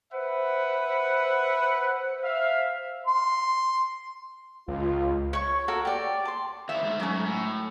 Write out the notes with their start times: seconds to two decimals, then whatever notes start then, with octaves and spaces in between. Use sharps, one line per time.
0.12 B4 C5 E5 F#5
2.23 E5 F5
3.07 C6
4.68 C#2 F4
5.33 C#5 C#6
5.68 F#4 A4 A#4
5.85 G4 D5
6.25 A5 C6
6.69 D#2 E3 E5
6.83 G#2 A3
7.00 F#3 C#4
7.26 A2